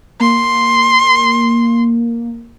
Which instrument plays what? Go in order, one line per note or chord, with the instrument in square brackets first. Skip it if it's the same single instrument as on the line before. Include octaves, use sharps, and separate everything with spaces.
[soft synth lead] A#3 [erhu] C6